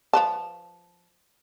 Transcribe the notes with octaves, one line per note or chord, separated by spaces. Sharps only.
F3 B4 A5